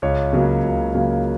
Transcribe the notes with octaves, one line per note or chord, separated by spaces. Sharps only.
C#2 C#5
C#3 F#3 A#3
C#2
C#3 F#3 A#3